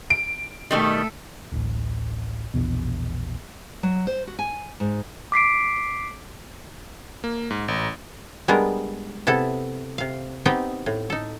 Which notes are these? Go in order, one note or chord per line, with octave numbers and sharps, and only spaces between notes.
D7
B2 D#3 G3 A3 A4
D1 A1
A#1 E2 B2
F#3
C5
F#4
G#5
G#2
D6 B6 C7 D7
A#3
G#2
A1
G3 G#3 B3 D4 A#4
C3 B3 E4 A4
C3 F5
B3 C4 D#4 G4 D#5 G5
A2
D#4 A4